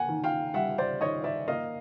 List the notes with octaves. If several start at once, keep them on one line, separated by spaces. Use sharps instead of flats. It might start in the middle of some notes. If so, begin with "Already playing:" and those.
Already playing: A#3 F#5 G#5
D#3
F5 G5
G3 E5 F#5
C5 D5
D#3 C#5 D#5
D5 E5
A#3 D#5 F5